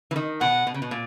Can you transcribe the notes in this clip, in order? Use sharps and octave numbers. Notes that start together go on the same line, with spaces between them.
E3
D#3
B2 F#5
B2
C#3
B2
A#2